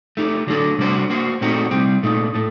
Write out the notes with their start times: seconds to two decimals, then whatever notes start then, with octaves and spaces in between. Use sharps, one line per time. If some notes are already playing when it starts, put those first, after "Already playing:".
0.17 A3 D#4 G4
0.47 D3 F#3 A3 D4 A4
0.78 C3 G3 D4 F#4 C5
1.10 A#3 F#4 C5
1.41 A#2 A3 C4 D#4 F#4
1.71 C3 G3 C4
2.03 A#2 A3 D#4
2.34 A2 A3